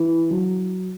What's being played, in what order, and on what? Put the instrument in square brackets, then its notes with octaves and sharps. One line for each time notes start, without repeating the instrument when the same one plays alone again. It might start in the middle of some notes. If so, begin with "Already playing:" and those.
Already playing: [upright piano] E3
F#3